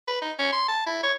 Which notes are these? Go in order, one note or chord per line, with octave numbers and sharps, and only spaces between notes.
B4
D#4
C#4
C6
A5
E4
C#5